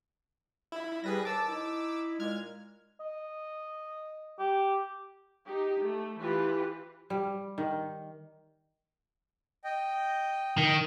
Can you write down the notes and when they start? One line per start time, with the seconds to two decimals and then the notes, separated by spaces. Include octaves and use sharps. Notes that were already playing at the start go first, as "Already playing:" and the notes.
0.72 E4
1.04 G3 G#4 B4 A#6
1.25 D#2 A5 D6 E6
1.49 D#4 E4
2.20 A#2 G#3 F6 G#6
3.00 D#5
4.39 G4
5.46 D#4 G4
5.82 A3
6.20 E3 F4 G4 B4
7.10 G3
7.58 D#3
9.64 D#5 G5
10.58 D#3